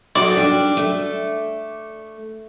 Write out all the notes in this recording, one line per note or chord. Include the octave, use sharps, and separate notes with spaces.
D#4 F#4 A4 D5
G3 D4
A3